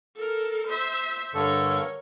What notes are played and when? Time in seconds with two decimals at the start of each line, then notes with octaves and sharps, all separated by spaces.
0.16 A4 A#4
0.67 C5 E5
1.34 G2 D3 A4 A#4 C#5